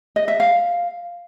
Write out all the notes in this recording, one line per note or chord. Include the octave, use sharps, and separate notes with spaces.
D#5
E5
F5